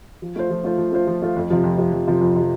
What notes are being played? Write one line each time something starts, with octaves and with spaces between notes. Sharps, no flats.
F3
A3 F4 C5
F3
A3 F4 C5
F3
A3 F4 C5
F3
A3 F4 C5
F2
C3 F3
F2
C3 F3
F2
C3 F3
F2
C3 F3